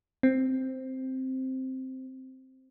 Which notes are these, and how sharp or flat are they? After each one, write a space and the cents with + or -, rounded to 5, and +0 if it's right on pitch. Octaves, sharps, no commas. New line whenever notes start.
C4 +0